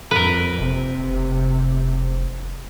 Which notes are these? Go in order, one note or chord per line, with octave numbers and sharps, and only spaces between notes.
F2 A#4 B4
F#1 C3
F1